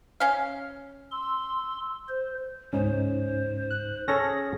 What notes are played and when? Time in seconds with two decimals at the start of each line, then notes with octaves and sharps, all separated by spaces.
0.20 C#4 F5
1.12 C6 E6
2.09 C5
2.73 C#2 G#2 C#4 D#4 C5
3.71 F#6
4.08 C#4 G#4 A4 C#5 A#6